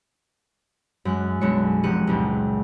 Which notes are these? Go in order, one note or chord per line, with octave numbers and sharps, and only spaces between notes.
F#2 G#3 F#6
B1 F#2 G#3 D4 C#5 C#7
F1 G4 F#6 C#7 D#7
F#1 C#2 A#2 G5